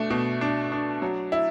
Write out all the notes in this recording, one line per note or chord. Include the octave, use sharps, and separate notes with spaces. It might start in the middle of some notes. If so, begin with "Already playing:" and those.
Already playing: B2 A3 D4
B2
D4
D4
F#3
E4